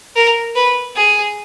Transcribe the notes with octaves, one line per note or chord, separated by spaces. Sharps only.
A#4
B4
G#4